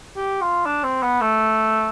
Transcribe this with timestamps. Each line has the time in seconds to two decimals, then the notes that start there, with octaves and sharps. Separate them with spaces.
0.17 G4
0.41 F4
0.66 D4
0.84 C4
1.03 B3
1.21 A3